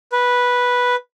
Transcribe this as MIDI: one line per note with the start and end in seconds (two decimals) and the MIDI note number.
0.12 0.95 71